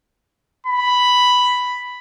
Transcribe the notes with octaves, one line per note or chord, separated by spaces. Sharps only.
B5